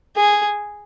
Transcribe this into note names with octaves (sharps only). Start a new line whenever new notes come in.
G#4